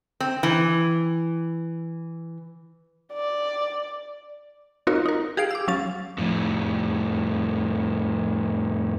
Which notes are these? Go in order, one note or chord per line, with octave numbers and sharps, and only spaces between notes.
C4
E3
D5
C4 D#4 F4 F#4 A#4 C#5
D#4 A#4
G4 G#4 F5 C7 D7
D6 E6
F#3 C#4 F5 A6
F2 A2